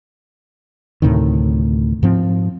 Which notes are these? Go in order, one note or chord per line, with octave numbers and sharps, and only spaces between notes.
D2 A2 C3 D#3
G#2 F3 C4